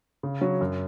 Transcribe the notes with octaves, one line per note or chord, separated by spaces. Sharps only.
C#3
F#3 C#4 F#4
F#2